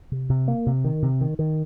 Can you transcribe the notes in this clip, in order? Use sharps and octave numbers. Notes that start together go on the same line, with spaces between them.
C3
C3
A#3
C3
D#3
C3
D#3
D#3